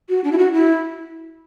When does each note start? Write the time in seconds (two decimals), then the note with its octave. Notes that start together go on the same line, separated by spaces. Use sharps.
0.09 F#4
0.24 D4
0.32 E4
0.38 F#4
0.53 E4